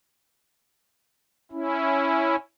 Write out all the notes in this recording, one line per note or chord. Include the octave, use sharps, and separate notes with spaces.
C#4 E4